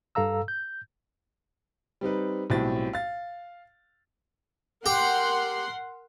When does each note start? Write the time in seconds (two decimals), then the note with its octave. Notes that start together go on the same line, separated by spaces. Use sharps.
0.15 G2 A4 F5 A#5 E6
0.48 G6
2.01 G3 C4 D#4 B4
2.50 B1 A2 G3 C4 A6
2.93 F5 A6
4.86 G4 A#4 F#5 C6